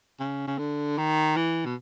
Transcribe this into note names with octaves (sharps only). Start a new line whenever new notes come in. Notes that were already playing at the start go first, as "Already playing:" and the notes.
C#3
C#3
D3
D#3
E3
B2